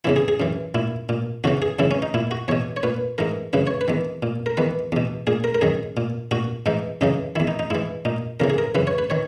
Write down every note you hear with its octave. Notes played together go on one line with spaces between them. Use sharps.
E2 C#3 E3 E4
G#4
G#4
F#2 E3
A#2 E4
A#2
E2 C#3 E3 F#4
G#4
F#2 C#3 E3 E4
C#4
D#4
A#2 E4
F#4
E2 B2 C#5
C#5
A#2 B4
G#2 E3 A#4
F#2 C#3 E3 B4
C#5
B4
E2 D#3
A#2
A#4
E2 D#3 B4
E2 B2
A#2 G#4
A#4
A#4
F#2 D#3 G#4
A#2
A#2 F#4
G#2 E3 D#4
F#2 C#3 E3 D#4
E2 D#3 E4
D#4
D#4
G#2 E3 E4
A#2 D#4
E2 C#3 E3 A#4
G#4
A#4
F#2 C#3 E3 B4
C#5
B4
D#3 C#5